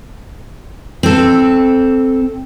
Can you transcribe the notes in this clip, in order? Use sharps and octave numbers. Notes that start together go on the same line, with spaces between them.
C4 A4